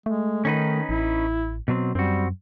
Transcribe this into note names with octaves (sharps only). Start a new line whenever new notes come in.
G#3 A3
D#3 C#4 D#4 B4
A1 E4
B2 F#3 C4
F#2 G3 C4 F#4